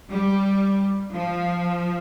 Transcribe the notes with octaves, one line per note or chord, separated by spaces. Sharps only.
G3
F3